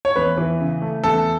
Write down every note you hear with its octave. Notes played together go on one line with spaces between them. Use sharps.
C#5
E2 B4
E3
C#3
A3
E2 A4